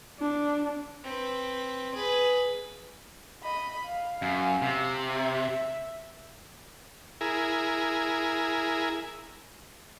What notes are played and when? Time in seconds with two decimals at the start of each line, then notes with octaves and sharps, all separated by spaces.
0.20 D4
1.04 C4 B4
1.94 G#4 B4
3.43 D#5 B5
3.85 F5
4.22 F#2
4.62 C3
5.09 E5
7.21 E4 G#4 A#4